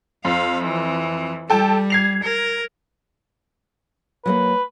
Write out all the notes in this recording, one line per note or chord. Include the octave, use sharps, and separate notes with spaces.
F2 F5
E3
G3 A4 G5 A5
G#6 C7 F7
A#4
F#3 G#3 A#3 B4